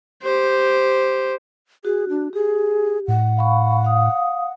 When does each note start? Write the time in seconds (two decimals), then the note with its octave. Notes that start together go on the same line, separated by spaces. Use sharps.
0.22 G4 C5
1.85 F#4 G#4
2.09 D4
2.33 G4 G#4
3.08 A2 F#5
3.37 F5 B5 C#6
3.85 F5 D#6